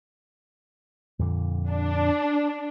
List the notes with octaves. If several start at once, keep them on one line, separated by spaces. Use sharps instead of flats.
F2 A#2 D3
D4